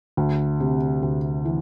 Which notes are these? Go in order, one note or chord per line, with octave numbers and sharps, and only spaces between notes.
D2
C3
D2
E3